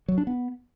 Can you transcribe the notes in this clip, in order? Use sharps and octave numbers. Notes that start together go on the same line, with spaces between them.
F#3
D4
B3